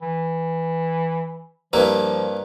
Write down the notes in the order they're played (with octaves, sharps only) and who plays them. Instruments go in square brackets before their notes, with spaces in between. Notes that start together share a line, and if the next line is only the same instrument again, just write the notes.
[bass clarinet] E3
[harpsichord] G2 A#3 E4 [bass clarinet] F3